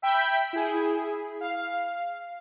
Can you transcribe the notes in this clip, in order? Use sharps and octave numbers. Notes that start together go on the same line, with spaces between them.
E5 G5 B5 G6 B6
E4 G#4
F5